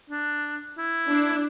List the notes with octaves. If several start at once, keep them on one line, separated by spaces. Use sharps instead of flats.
D4
E4
D4